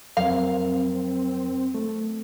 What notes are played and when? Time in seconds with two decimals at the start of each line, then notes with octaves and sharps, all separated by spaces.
0.17 F2 F#3 C4 A#4 F5
1.75 A3